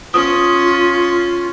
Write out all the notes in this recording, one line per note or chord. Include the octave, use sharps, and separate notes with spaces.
C#4 F4 D#6